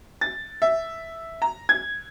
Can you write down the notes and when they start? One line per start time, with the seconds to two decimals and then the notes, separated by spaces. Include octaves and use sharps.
0.21 A6
0.62 E5
1.42 A#5
1.69 G#6